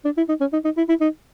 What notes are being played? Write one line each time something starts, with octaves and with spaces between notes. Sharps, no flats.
D4
E4
D#4
C#4
D#4
D#4
E4
E4
D#4